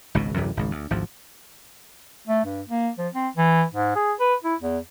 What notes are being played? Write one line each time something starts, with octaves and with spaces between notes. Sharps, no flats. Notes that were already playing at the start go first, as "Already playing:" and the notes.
G#1 C#2 G#2 B2
D1 F#2 C3 E3
G#1 C#2
D2
G#1 D2 F3
A3
G2
A#3
F3
C4
E3
G#2
G#4
B4
E4
E2